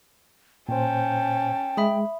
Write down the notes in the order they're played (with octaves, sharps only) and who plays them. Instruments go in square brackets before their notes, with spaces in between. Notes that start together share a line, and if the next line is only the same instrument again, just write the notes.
[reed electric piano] A#2 C5 [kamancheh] C#4 A5 [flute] G5
[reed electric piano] G#3 [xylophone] E5 B5 D#6